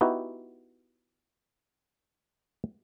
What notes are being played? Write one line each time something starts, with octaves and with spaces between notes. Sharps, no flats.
B3 D#4 E4 F#4 G4